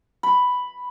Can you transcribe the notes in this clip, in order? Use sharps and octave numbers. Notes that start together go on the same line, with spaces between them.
B5